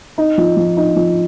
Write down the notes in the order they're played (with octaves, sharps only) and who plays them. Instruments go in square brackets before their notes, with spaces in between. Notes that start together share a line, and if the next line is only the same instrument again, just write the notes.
[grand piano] D#4
F3
F3
D#4
F3